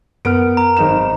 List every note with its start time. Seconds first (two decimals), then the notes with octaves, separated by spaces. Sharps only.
0.25 F#2 B3 A#4 F6 D7
0.57 A#5
0.77 G#1 D#4 E7